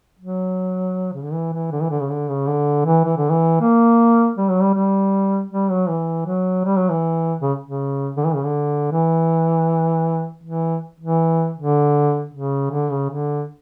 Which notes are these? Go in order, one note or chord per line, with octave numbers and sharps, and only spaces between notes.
F#3
C#3
D3
E3
E3
D3
E3
D3
C#3
D3
C#3
D3
E3
E3
D3
E3
A#3
G3
F#3
G3
G3
G3
F#3
E3
F#3
G3
F#3
E3
C#3
C#3
D3
E3
C#3
D3
E3
E3
E3
D3
C#3
D3
C#3
D3